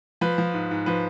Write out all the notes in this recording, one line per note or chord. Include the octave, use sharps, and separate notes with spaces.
F3 B4
F3
G#2
G#2
F3 B4